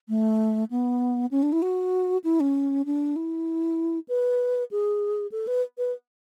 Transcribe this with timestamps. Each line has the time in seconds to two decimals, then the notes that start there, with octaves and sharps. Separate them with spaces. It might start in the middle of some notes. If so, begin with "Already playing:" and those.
0.09 A3
0.71 B3
1.31 C#4
1.43 D4
1.52 E4
1.62 F#4
2.24 E4
2.40 C#4
2.86 D4
3.16 E4
4.09 B4
4.71 G#4
5.32 A4
5.47 B4
5.78 B4